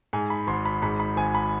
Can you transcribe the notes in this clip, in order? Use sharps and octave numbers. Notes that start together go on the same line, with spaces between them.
G#2 G#5
B5
G#1 C6
B5
G#2 B5
B5
G#1 G#5
B5